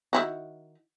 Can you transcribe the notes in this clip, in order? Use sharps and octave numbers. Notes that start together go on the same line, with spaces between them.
D#3 E4 F#4